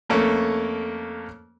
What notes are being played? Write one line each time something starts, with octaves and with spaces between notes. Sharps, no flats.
F2 A3 A#3 C#4 C#5